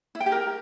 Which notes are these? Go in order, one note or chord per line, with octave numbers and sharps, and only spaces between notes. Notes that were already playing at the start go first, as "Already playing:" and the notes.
E4
G5
G4
A#4